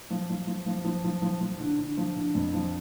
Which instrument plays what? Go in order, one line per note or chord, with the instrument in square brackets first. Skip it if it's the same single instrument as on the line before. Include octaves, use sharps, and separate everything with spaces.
[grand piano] F3
F3
F3
F3
F3
F3
F3
F3
D3
D3
F3
D3
F2
F3